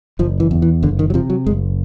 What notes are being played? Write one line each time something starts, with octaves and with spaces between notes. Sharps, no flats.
F#1 F3
E3
E2
E3
F#1 D3
D#3
F#3
C3 F3
F#3
F#1 G#3